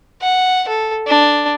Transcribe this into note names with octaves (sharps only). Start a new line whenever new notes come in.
F#5
A4
D4